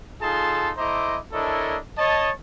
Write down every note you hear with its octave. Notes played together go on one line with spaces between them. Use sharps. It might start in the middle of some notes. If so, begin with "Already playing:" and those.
D#4 F4 G#4 A4 A5 C6
A3 E4 C5 D#5 A#5 D6
D4 E4 A4 A#4 C#5 D#5
C#5 D#5 A5